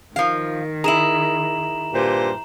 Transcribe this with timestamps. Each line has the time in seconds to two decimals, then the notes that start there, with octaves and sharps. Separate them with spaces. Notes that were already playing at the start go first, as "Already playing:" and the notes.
0.16 D#3 F3 F5
0.84 E4 G#4 A#5 E7 F#7
1.93 G2 A#2 C5